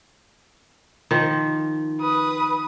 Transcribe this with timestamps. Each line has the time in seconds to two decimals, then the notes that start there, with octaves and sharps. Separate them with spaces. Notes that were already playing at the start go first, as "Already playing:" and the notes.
1.11 D#3 F3
2.00 B4 D#6